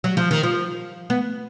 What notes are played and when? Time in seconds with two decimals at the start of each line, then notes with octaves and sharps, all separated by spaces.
0.04 F#3
0.17 F3
0.31 D#3
0.43 F3
1.10 B3